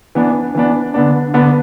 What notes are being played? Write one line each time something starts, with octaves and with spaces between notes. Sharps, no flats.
E3 B3 D4
E3 B3 D4
D3 B3 D4
D3 B3 D4